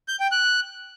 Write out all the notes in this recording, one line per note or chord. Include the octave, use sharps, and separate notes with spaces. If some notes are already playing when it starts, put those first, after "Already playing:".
G6
G5
F#6